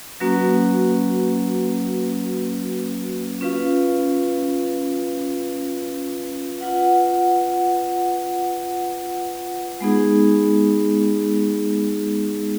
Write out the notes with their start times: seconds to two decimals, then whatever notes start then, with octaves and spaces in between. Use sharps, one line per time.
0.20 F#3 A#3 C#4 F#4 B4
3.41 C#4 F4 B4 F5
6.61 F4 B4 F#5
9.81 G#3 B3 D#4 G#4